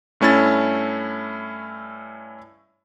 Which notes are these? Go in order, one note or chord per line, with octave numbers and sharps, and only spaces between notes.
G2 A3 C#4 E4 A6